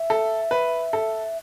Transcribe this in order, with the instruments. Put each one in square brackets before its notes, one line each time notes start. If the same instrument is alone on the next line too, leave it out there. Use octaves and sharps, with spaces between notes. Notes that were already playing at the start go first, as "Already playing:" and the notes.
Already playing: [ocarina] E5
[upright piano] A4
B4
A4